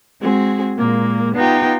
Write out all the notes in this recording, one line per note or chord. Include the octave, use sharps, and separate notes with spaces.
G#3 C4 F#4 G#4
A#2 G#3 A#3
B3 D#4 F4 G4 G5